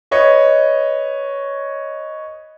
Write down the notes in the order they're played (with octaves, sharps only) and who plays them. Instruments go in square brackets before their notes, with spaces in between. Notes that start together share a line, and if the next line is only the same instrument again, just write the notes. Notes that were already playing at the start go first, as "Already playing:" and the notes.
[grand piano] B4 C#5 D#5